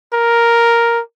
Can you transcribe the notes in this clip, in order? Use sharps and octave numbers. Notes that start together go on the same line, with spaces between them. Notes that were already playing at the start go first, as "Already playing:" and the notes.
A#4